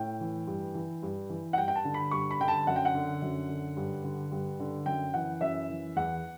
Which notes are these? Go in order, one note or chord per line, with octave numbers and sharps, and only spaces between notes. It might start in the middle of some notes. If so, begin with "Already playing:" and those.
Already playing: A2 G5
E3
G2
E3
G2
E3
F#5
G2 G5
G5
A5
D3
B5
G2 C#6
B5
D3 G5
A5
F#2 F#5
G5
F#5
D3
F#2
D3
G2
D3
G2
D3
F#2 G5
E3 F#5
F#2 E5
E3
E2 F#5